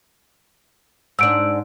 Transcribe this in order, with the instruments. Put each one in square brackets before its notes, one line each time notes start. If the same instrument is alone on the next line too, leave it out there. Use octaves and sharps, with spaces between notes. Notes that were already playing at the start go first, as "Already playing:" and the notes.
[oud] G#2 D4 [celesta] E6 D7